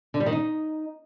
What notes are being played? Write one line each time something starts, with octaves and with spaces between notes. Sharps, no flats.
D3
G3
D#3
D#4